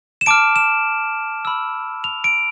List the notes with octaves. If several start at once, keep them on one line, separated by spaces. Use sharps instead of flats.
E7
A5 D6 F6 D7
E7
B5 E6
F7
D7